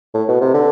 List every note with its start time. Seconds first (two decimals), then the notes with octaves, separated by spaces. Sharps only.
0.14 A2
0.28 B2
0.41 C3
0.54 D3